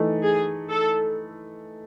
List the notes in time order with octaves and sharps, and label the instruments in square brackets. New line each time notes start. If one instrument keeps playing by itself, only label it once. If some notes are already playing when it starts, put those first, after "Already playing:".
Already playing: [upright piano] E3 A3 D#4
[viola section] G#4
A4